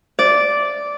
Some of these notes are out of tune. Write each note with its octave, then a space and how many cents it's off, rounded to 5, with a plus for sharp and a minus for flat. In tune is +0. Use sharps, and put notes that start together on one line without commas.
D5 -10